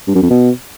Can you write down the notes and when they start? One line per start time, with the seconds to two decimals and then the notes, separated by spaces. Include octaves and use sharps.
0.07 G2
0.15 F#2
0.23 F2
0.30 B2